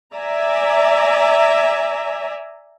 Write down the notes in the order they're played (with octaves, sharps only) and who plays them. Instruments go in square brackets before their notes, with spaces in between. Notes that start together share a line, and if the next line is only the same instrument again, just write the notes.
[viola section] D5 E5 G#5 A#5